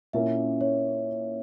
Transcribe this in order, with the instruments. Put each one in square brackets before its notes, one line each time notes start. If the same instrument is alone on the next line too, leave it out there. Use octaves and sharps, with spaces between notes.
[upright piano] A#2 A#3 C#4 [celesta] E4 E5
[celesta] C#5